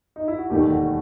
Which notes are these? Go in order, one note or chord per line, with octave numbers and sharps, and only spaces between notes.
D#4
E4
F#4
E1 D#2 D#3 A3 G4
F#4